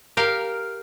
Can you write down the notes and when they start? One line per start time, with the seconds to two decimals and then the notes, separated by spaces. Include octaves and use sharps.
0.17 G4 A#4 F5